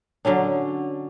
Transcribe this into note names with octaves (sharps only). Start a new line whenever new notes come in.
D3 F#3 C#4 D4